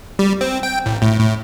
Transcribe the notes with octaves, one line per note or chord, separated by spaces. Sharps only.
G3
C4
G5
A1
A2
A2